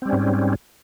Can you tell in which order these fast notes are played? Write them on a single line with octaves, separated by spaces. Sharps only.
C4 G3 C#4 G#2